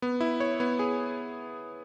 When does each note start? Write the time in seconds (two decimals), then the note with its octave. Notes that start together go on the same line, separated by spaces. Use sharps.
0.02 B3
0.21 E4
0.40 C#5
0.60 B3
0.79 G#4